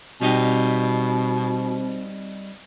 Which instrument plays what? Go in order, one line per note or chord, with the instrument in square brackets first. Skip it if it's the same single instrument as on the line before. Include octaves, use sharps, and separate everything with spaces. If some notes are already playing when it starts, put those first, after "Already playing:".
[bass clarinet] B2 [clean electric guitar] G3 D#4 G4 [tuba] C4